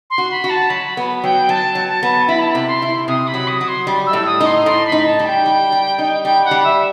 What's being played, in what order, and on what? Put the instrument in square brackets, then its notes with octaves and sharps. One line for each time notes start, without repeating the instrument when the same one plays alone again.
[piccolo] C6
[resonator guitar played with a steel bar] F#4
[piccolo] B5
[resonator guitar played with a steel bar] F#4
[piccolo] A5
[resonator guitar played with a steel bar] F#3 [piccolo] B5
[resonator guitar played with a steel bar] B3
[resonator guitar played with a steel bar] F#3 [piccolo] G5
[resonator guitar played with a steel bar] F#3 [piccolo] A5
[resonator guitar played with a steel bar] F#3
[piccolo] A5
[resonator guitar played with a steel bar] B3
[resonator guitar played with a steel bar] E4 [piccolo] B5
[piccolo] A5
[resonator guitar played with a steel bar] C3 [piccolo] B5
[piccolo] C6
[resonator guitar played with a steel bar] E4
[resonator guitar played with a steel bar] C3 [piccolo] D#6
[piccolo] B5
[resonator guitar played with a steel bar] F#3
[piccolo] D#6
[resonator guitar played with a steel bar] F#3
[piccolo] C6
[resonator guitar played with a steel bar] G3
[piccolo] E6
[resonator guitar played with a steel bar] A2
[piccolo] D#6
[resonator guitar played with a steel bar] D#4
[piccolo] C6
[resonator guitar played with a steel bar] A2 [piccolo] C6
[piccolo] B5
[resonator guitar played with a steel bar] D#4
[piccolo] A5
[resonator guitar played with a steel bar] G3
[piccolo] G5
[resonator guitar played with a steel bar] G3
G3
D#4
[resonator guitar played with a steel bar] G3 [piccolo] G5
[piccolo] F#5
[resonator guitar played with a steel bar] G3
[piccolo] E5